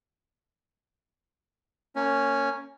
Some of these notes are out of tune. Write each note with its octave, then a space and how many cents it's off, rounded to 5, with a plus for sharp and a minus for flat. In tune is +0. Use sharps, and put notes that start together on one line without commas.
A#3 -25 C#4 +0